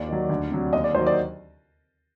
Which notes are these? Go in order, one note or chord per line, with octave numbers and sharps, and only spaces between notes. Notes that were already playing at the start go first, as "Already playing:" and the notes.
Already playing: D#2 D5
D#3 F#3
D2
C3 F#3
D#2 D#5
D5
D#3 F#3 C5
D5